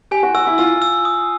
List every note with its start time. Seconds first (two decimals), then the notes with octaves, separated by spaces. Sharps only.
0.11 G4 G#5
0.23 F#4
0.34 F#4 E6
0.47 E4
0.58 F4 E6
0.82 E6
1.05 D#6